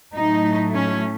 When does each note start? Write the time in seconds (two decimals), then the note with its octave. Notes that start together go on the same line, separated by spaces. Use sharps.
0.15 A2 F#3 A3 D#4
0.74 C#4